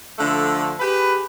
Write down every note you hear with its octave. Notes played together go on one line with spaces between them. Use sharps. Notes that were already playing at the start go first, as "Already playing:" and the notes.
D3 F3 A3 D4
G4 G#4 B4